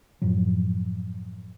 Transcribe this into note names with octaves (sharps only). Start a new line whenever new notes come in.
F#2 A2 F3 F#3